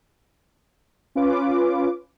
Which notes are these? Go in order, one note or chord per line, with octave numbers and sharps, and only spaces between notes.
C#4 F4 B4 D6